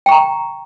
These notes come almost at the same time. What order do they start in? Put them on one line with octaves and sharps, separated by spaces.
G5 C#6 A#5